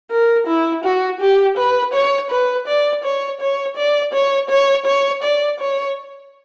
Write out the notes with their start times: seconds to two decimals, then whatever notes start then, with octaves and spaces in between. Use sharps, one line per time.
0.11 A#4
0.47 E4
0.84 F#4
1.20 G4
1.57 B4
1.93 C#5
2.30 B4
2.68 D5
3.04 C#5
3.41 C#5
3.77 D5
4.13 C#5
4.50 C#5
4.86 C#5
5.23 D5
5.60 C#5